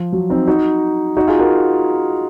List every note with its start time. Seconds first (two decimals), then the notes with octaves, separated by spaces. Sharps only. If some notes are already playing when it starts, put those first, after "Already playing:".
Already playing: F3
0.12 F#3
0.30 C4 D#4
0.47 D#4 F#4
1.17 D#4 F#4
1.28 F4 G#4
1.39 F#4 A#4